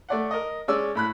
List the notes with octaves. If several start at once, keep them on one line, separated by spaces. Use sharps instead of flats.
A3 D5 F#5
A#4 D#5
G#3 C#4 D5 E6
A2 B5 F#6